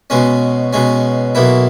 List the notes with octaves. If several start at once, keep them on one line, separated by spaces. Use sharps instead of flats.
B2 G#3 C#4
B2 G#3 C#4
B1 B2 A#3 E4